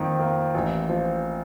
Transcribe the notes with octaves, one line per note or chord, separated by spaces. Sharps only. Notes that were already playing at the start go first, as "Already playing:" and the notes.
Already playing: F2 D#3 A#3
A#3
A1
F3